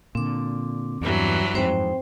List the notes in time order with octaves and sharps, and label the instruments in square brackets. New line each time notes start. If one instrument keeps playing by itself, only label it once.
[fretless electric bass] A#2 D3 [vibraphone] C4 D6
[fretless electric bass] E2 [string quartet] G2 E3 F#3
[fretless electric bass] F2 G#2 [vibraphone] C4 C5 G5